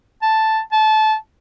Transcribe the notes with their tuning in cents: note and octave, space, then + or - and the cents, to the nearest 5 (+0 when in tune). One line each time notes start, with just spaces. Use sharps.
A5 +0
A5 -20